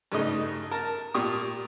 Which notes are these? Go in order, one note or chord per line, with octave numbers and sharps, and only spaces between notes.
G2 C#3 A3 D#4 D#5
A#4 A5
A#2 G4 C#6 D#6